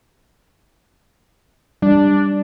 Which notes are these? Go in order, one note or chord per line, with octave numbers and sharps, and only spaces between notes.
G3 D4